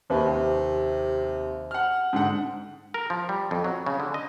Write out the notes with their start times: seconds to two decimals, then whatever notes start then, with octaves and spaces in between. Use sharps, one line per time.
0.10 D#2 C3 A#3 B4
0.27 D#2
1.71 F#5 F6
2.13 G#2 D3 F#5
2.94 A#4
3.10 F3
3.29 G3
3.51 F2
3.64 F#3
3.86 C#3
4.00 D3
4.14 D#5